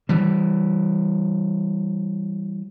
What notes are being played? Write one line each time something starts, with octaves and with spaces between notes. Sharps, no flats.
E3 G3